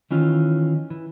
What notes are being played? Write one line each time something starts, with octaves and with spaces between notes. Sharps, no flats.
D#3 E3 C#4 F4
E3